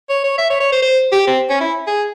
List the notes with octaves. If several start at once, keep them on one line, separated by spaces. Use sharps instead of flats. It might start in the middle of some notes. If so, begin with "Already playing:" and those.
C#5
C#5
E5
C#5
C#5
C5
C5
G4
C4
C#4
E4
G#4